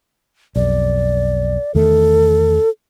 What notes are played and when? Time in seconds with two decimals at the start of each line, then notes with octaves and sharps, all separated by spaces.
0.56 B1 F2 D5
1.75 E2 D#3 A3 A4